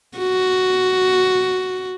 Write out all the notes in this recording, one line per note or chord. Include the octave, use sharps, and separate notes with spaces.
F#4